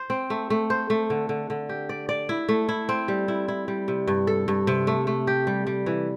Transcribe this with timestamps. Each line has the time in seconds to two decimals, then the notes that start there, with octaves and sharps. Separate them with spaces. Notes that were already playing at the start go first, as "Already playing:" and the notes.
Already playing: C5
0.10 C4
0.30 A3
0.50 A3
0.70 C5
0.90 A3
1.10 D3
1.29 D3
1.50 D3
1.69 G4
1.89 D5
2.09 D5
2.29 E4
2.49 A3
2.69 E4
2.89 C4
3.08 G3
3.28 E4
3.48 E4
3.68 G3
3.88 C3
4.08 G2
4.27 A4
4.48 G2
4.67 C3
4.87 A3
5.07 A3
5.27 G4
5.47 G3
5.67 G3
5.86 E3